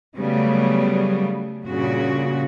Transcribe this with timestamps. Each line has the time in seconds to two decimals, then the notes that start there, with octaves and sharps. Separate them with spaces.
0.17 C#3 F#3 G3 A3 B3
1.64 G2 A#2 C#3 F#4